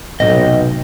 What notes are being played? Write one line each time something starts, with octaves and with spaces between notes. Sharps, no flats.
B1 A2 C3 D#5 G5